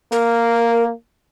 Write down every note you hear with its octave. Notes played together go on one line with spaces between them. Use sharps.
A#3 A#4